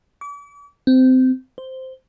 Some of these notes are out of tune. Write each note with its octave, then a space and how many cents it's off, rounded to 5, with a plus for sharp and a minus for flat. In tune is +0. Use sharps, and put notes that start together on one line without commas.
D6 -40
C4 -20
C5 -5